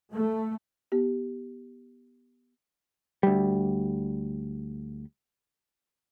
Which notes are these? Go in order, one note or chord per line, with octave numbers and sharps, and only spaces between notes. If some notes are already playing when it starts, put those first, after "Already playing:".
A3
B3 G4
D2 G3